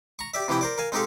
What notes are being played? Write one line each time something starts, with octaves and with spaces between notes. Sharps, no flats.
A#5 C#6
G4 D5 E5
C3 E3 F3 E4 G5
A#4 C5 D5
A#4 F5 G#5
G#3 C4 D#4 G4 A4 F5